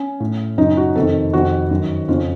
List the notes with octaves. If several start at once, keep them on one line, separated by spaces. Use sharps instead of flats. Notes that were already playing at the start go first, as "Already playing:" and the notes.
Already playing: C#4
A2
F#2 C#3 D#4
F#4
F2 C3 D#3 A4
F2 C3 D#3 F#4
F#2 D#3
F2 C#3 F4